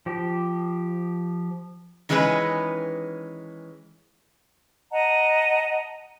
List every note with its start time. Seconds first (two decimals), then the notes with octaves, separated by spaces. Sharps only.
0.06 F3 G4
2.09 D#3 E3 G#3 C#4 G#4 B4
4.92 D#5 F#5 A5 A#5